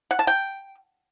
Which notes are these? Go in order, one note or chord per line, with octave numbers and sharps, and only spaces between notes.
F#5
A5
G5